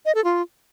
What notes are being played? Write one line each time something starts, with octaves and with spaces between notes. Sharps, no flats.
D#5
A4
F4